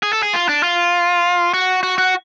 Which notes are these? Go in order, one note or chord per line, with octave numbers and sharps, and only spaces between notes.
G#4
A4
G#4
F4
D4
F4
F#4
F#4
F#4